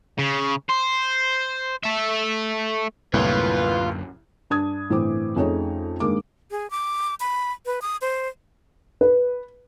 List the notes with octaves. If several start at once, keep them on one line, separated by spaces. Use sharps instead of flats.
C#3
C5
A3 E5
C2 F#2 A2 D3 A#3 F4 B4 C#5
G2 D4 D#6 G#6
G1 A2 E3 C4 D6
F2 A3 C#4 D#4 G#4 C#5
G2 D#3 G#3 A#3 D6
G#4
D6
B5
B4
D#6
C5
B4